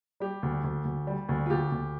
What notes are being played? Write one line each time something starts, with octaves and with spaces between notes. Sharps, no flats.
G3 G4
D2
D2
D2
G3
D2
F4
D2 G4
D2